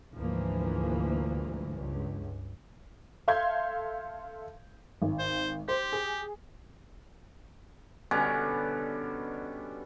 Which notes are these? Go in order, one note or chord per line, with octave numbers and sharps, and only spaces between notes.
D2 G#2 E3 F3 A#3
C#2 G2
A4 E5 F5 C6 G6 G#6
G#1
C5
G4 C5
G#4
B2 D3 G3 C#4